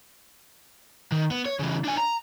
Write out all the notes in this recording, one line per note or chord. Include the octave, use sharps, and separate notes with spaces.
D#3
B3
C#5
C#3 E3
D4 G#5
A#5